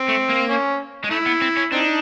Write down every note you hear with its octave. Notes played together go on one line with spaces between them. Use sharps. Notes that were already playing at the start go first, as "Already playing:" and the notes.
Already playing: C4
A3
A#3
C#4
G#3
A3 E4
B3
C4
C#4
C4 D4 D#4